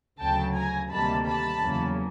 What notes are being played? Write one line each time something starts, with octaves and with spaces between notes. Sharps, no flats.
D2 C#3 F#3 G5 A5
G#5 A#5
D2 C3 D#3 G3 A#3 A5 B5
A5 B5
E2 C#3 F#3 A#3